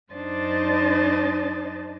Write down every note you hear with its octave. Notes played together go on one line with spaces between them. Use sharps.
F#2 D4 D#4 C5 D#5 A6